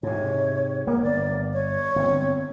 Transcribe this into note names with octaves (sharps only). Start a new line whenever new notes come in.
G#2 C3 C#5
A#3 B3 A#4
G1 D5
C#5
G1 D3 C4